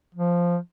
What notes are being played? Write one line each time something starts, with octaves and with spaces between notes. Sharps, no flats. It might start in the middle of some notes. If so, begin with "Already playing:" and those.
F3